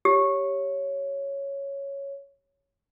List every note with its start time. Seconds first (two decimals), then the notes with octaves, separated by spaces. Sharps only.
0.05 G4 C#5